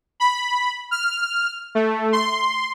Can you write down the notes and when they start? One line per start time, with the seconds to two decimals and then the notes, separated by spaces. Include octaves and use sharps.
0.20 B5
0.91 F6
1.75 A3
2.13 C6